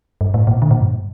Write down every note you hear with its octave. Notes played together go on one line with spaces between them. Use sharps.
G2
A2
A#2
D3
A#2
G2